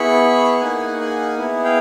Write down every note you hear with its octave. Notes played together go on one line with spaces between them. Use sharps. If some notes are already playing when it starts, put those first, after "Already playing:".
Already playing: B3 E4 G#4 B5 C#6
A#3 D#4 G#4 F#5 G#5
F#5 G#5
B3 E4 G#4
F5 G5